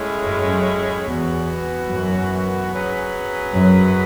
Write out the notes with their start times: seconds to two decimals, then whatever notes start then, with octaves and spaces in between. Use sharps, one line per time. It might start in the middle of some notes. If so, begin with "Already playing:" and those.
Already playing: A2 G#3 C#4 E4
0.25 F#2
1.07 E2 E3 B3 F#4
1.90 F#2
2.73 F#3 C#4 G#4 B4
3.55 F#2